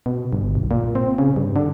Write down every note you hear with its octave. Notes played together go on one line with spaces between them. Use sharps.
B2
G1
B1
A#2
C4
C#3
G2
D3